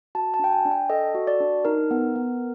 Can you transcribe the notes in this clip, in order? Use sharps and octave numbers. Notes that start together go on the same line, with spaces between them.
F#4 A5
A5
D4 G5
G#5
D4
G5
A4 D#5
F#4
D5
D4
D#4 A#4
B3
B3